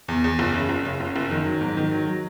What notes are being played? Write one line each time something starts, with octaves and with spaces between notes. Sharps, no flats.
E2
E2
F#1
C#3
F#1
C#3
F#1
F#1
D#3
F#3
G#2
D#3
F#3
F#3